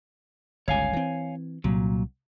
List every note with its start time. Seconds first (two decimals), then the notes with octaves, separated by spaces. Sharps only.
0.68 G1 C#2 C#5 F5 G#5
0.93 E3 C4
1.64 C2 A#2 F#3